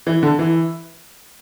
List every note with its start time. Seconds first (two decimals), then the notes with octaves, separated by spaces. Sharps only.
0.07 E3
0.23 D3
0.39 E3